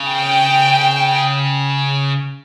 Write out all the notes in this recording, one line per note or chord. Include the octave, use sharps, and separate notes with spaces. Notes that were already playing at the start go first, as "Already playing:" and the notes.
Already playing: C#3
G5